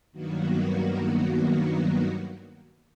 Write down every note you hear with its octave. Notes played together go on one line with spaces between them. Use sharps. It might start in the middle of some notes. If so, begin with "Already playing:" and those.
G2 D#3 F#3 A#3 B3 F#4